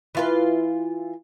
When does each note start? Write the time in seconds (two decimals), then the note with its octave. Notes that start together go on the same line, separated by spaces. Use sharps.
0.15 E3 F4 B4